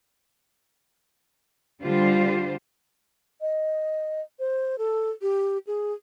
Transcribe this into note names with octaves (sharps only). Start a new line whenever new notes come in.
D3 G3 F4 C5
D#5
C5
A4
G4
G#4